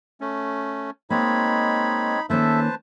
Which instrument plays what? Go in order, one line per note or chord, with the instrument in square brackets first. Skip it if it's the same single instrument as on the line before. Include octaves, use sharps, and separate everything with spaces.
[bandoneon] A3 C#4
[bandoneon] G#3 C4 C#5 [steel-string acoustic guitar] A#3 [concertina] D#4 B5
[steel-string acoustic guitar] D#3 A#3 C#4 [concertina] A4 E5 [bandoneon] B4 C5 A5